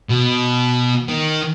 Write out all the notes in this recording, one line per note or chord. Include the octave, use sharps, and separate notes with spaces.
B2
D#3